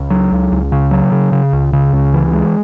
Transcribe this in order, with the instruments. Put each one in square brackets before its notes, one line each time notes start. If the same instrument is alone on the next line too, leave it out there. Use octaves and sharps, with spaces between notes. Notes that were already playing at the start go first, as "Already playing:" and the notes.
Already playing: [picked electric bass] C#2
F#3
C#2
C#2
C#3
F#3
C#3
C#3
C#2
C#3
C#2
E3
G#3